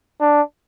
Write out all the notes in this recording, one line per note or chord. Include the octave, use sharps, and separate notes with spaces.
D4